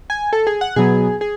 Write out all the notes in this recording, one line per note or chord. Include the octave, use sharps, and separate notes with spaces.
G#5
A4
G#4
F#5
B2 F#3 B3 G#4
G#4